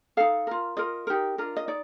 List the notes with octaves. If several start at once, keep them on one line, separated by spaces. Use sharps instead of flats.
D#4 A4 F5
F4 A#4
F4 A#4 D#5
D#4 G4 A#4
D4 F4 A#4
D#5
D#4 D5